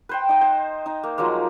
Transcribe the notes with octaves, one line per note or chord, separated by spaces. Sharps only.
B4 C5 G5
D#4 D#5
C5
D#4
A#3
F3 F#3 G#3 A#3